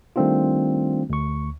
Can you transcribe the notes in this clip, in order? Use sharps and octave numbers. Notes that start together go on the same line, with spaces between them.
D#3 G3 A3 C4 D4 F4
D2 C#6